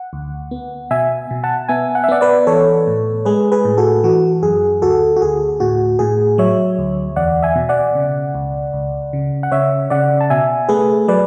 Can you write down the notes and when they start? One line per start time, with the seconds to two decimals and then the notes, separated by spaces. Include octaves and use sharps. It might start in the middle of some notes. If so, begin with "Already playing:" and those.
Already playing: F#5
0.13 D2
0.51 B3
0.90 B2 E5 G#5
1.31 B2
1.44 F#5 A5
1.69 B3 E5 G#5
1.95 F#5
2.04 E5
2.08 B3 D5 F#5
2.21 B4 D5
2.47 E3 A4 C#5
2.87 A2
3.25 G#3 G#4 B4
3.52 G#4 B4
3.65 A2
3.77 F#4 A4
4.04 E3 F#4
4.43 F#2 G#4
4.82 D2 F#4 A4
5.16 F#4
5.22 D2 G#4
5.60 A2 F#4
5.99 A2 G#4
6.38 F#3 C#5 E5
6.78 D2
7.16 E2 D5 F#5
7.42 E5 G#5
7.56 B2
7.69 D5 F#5
7.95 C#3
8.35 C#2
8.73 C#2
9.13 C#3
9.43 F#5
9.52 C#3 C#5 E5
9.90 C#3 D5 F#5
10.21 A5
10.30 B2 E5 G#5
10.69 A3 G#4 B4
11.08 F#3 B4 D5